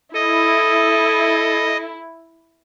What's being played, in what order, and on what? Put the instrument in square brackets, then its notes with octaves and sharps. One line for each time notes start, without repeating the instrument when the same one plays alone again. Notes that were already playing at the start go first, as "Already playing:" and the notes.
[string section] E4 [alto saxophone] A4 [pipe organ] D#5